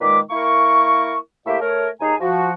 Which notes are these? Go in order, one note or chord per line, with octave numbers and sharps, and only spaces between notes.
A#2 D#3 G#3 B4 D6
A#3 E4 A#4 C#6
A2 A#3 G4 E5
A3 A#4 C#5
D#2 D#4 G#4 G#5 A#5
F3 F#4